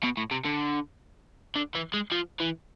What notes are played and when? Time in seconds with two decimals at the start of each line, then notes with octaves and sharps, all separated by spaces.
0.03 B2
0.17 A2
0.31 C3
0.45 D3
1.56 D3
1.75 E3
1.94 G#3
2.12 F3
2.40 E3